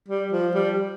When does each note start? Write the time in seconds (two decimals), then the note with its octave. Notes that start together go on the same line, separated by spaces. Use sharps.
0.09 G3
0.32 F3
0.55 G3